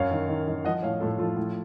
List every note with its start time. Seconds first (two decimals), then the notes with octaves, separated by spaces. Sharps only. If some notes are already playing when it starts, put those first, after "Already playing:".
Already playing: F#2 C#5 F5
0.11 D#3
0.28 D#3
0.48 D#3
0.65 F3 D#5 F#5
0.82 A2 C#5 F5
1.01 A2 F4 A4
1.19 F3 F4 A4
1.37 A2